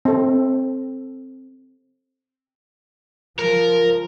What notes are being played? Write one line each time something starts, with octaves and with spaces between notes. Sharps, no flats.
C4 A4
F3 A#4